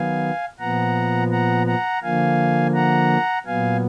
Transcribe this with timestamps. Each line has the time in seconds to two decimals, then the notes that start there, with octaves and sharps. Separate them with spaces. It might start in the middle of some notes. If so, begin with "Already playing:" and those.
Already playing: D#3 F#3 B3 F5 G#5
0.60 A#2 F3 B3 F#5 A#5
1.31 F#5 A#5
1.67 F#5 A#5
2.03 D3 F3 A#3 F5 G#5
2.74 F#5 A#5
3.46 A#2 F#3 B3 F5 G#5